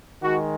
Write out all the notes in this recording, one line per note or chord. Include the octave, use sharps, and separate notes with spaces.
D#3 G#3 F#4